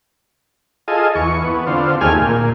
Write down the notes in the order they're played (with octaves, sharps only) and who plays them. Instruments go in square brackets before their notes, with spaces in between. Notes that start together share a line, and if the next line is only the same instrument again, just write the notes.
[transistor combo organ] F4 G#4 A4 D#5
E2 C#6
B3
D3 C4 F4
D#2 A3 G4 G#4 G#5 F6
A#2